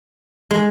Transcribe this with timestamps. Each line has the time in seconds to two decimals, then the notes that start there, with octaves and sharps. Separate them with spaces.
0.51 G#3